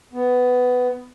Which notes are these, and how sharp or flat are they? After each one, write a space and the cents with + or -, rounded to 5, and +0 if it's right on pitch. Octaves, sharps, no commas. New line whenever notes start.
B3 +15